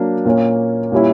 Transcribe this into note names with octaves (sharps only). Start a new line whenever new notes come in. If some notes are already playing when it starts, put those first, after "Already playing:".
Already playing: F#3 A#3 D4
A#2 A#3 C#4
A#2 G3 C#4 E4